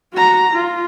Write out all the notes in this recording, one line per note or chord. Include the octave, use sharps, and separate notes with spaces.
F#4 A#5
F4